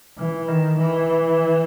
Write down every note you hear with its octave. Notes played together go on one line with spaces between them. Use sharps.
E3
D#3
E3